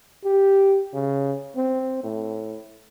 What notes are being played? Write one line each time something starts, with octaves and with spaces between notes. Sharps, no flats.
G4
C#3
C4
A2